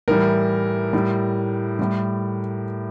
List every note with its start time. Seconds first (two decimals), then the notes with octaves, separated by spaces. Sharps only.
0.08 A2 E3 G3 A#4
0.93 A2 G3
1.79 A2 G3